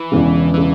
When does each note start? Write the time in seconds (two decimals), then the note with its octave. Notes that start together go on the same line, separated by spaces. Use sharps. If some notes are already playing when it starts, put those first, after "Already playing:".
Already playing: E3
0.12 E1 E2 C#3
0.54 C#3 E3